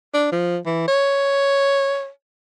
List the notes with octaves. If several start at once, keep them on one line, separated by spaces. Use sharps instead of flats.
D4
F3
E3
C#5